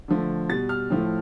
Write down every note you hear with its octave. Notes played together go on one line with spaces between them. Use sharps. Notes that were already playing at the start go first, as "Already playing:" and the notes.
D3 F3 A3
B2 G3 A6
F6
A2 F3 A3